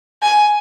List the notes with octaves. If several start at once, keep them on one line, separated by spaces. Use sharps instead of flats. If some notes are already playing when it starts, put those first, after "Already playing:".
G#5